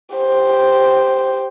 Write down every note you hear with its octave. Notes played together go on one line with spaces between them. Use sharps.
G4 C5